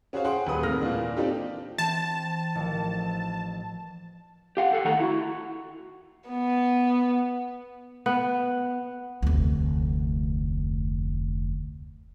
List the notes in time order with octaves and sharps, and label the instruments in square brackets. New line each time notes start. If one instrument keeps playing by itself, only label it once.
[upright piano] C#4 F#4 G#4 C5 C#5 F5
G#4 F#5 G5 C6
D#1 G#4 B4 D#6
D#2 C3 A3 A#4 F6 A#6
A#2 E3 A#3 D4
C4 D4 D#4 F4 G4 A4
[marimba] E3 [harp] C4 A#6 [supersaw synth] A5
[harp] A1 D#3 F3
[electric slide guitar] G4 F5 F#5
G4 A4 F#5
D#3 A3 A4 F#5 A#5
E4 F#4
[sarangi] B3
[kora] B3
[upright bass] F1 D2